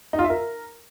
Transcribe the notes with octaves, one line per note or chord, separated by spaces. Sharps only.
D#4
F4
E5
A#4